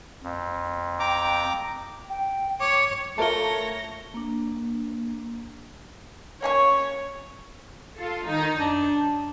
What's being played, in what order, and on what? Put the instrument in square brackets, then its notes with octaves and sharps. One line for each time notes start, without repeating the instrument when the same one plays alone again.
[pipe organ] F2
[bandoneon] G5 A#5 D6
[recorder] G5
[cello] C#5 [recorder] D6
[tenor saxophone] A3 [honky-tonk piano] F4 A#4 A5 [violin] C#5 A#6 [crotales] C#7 G7
[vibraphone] A#3 D4
[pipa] A#3 C#4 C#6 [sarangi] C#5
[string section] F4 A4
D#3 D#4
[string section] F#2 [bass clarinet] D4